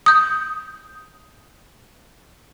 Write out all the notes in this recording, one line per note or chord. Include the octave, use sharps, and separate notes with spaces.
D#6 G6